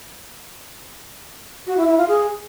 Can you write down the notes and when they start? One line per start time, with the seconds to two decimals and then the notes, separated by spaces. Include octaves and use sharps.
1.66 F#4
1.77 E4
1.87 E4
1.97 F4
2.08 G#4